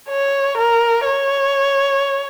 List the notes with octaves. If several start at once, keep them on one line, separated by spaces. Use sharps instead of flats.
C#5
A#4
C#5